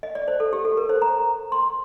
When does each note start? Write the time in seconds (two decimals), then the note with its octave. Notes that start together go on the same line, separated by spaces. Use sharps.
0.03 D#5
0.15 D5
0.28 C5
0.40 A4
0.53 G4
0.65 A4
0.77 A#4
0.89 C5
1.02 A#5
1.52 C6